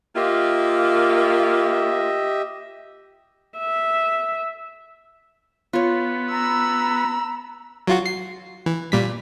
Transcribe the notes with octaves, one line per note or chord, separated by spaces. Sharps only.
A#3 F4 G4 D#5 E5
E5
B3 F4 C#5
A#5 B5 E6
F#3 F4 F#4
C7
E3
A#2 G3 B6